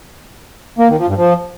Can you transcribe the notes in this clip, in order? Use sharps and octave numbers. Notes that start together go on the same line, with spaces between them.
A#3
D#3
F3
G2
F3